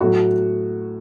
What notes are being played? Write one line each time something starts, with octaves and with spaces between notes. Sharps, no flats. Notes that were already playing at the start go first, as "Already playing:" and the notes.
A2 F#3 F#4